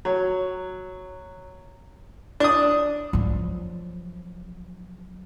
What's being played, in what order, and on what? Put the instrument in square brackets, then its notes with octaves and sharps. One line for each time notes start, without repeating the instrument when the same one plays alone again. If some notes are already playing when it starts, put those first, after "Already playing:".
[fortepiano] F#3
D4 D#6
[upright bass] F3 F#3